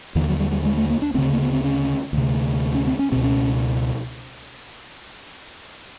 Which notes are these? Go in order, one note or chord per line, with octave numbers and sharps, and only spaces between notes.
D#2 D3 E3
F#3
G3
G3
G#3
A3
A#3
D4
D2 C#3 C4
A#3
B3
C4
C#4
D2 C3
C#4
C4
C#4
C#2 B2 C4
C#4